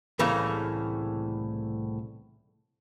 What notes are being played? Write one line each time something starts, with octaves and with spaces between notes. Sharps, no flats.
C2 A2 C#3 E3 A3 A#3